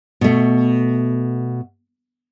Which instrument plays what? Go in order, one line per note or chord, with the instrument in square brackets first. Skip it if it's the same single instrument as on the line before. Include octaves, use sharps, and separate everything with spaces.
[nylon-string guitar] B2 A3